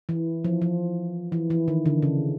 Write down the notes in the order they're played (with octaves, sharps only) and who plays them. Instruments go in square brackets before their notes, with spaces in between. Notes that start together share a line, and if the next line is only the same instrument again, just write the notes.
[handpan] E3
F3
F3
E3
E3
D#3
D3
C#3